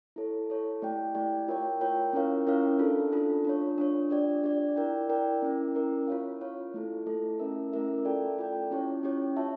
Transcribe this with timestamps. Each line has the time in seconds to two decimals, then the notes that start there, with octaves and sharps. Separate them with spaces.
0.16 E4 A4 C#5
0.50 E4 A4 C#5
0.82 A3 E4 G4 D5 G5
1.15 A3 E4 G4 D5 G5
1.48 F4 A#4 C#5 G5
1.81 F4 A#4 C#5 G5
2.13 C#4 E4 A#4 C#5 F5
2.47 C#4 E4 A#4 C#5 F5
2.79 D4 F4 A4
3.12 D4 F4 A4
3.44 D4 F4 C#5
3.78 D4 F4 C#5
4.10 D4 G4 D5
4.44 D4 G4 D5
4.76 E4 A#4 D5 G5
5.09 E4 A#4 D5 G5
5.42 C#4 E4 A#4
5.75 C#4 E4 A#4
6.08 F4 C#5 F5
6.41 F4 C#5 F5
6.74 A3 E4 A4
7.06 A3 E4 A4
7.39 A3 C#4 E4 A#4 E5
7.72 A3 C#4 E4 A#4 E5
8.05 F4 A4 D5 G5
8.38 F4 A4 D5 G5
8.71 C#4 E4 G4 C#5
9.03 C#4 E4 G4 C#5
9.37 F4 C#5 E5 A5